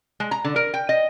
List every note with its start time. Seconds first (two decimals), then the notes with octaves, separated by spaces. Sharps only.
0.20 G#3
0.31 A#5
0.44 D3
0.56 A#4
0.74 G5
0.89 D#5